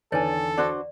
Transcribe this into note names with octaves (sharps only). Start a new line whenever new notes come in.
E2 D3 D#3 A4 B4 C#5 D5 G#5
D4 F#4 C5 D5